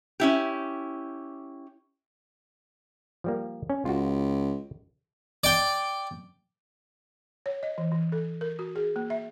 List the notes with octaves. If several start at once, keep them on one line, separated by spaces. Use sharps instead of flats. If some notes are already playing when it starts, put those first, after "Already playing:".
C#4 E4 G4
F3 G3 A#3
C#4
C#2 F4 F#4
D5 G5
C#5
D#5
E3
E3
A4
A#4
F#4
G#4
A#3
E5